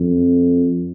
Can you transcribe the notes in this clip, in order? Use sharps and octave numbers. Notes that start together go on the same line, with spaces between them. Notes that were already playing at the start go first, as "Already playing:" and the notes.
Already playing: F2